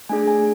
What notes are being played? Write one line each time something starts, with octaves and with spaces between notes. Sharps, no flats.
A3 D4 G#4 G#5
G#5